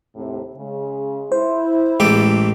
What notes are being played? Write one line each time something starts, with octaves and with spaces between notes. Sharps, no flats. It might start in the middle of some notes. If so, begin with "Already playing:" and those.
D#2 A2 C3
C#3 G#3
E4 C5
A1 G#3 G4 A4